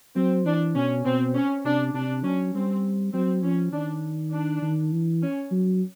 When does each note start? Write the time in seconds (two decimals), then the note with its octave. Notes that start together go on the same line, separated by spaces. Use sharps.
0.16 F#3 C4
0.45 E3 D4
0.76 B2 C#4
1.05 B2 C4
1.35 C#4
1.64 C3 D4
1.94 C3 D4
2.24 F#3 C#4
2.54 G3 C4
3.13 F#3 C4
3.43 F3 C#4
3.72 D#3 D4
4.33 D4
4.62 D#3
4.92 E3
5.22 C#4
5.51 F#3